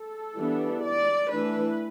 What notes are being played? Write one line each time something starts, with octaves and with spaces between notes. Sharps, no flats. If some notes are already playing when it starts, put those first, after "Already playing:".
Already playing: A4
E3 G3 B3 D4
D5
E3 A3 D4 B4